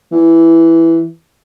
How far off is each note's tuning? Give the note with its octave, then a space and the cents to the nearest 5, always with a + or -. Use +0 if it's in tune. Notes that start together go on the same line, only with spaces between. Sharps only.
E3 +0